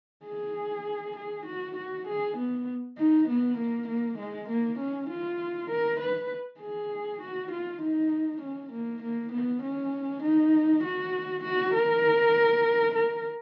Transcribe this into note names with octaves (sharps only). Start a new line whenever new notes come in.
G#4
G#4
F#4
F#4
G#4
B3
D#4
B3
A#3
A#3
G#3
A#3
C#4
F4
A#4
B4
G#4
F#4
F4
D#4
C#4
A#3
A#3
B3
C#4
D#4
F#4
F#4
A#4
A#4